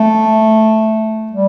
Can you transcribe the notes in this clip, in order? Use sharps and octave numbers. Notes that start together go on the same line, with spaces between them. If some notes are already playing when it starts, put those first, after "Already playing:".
Already playing: A3
G3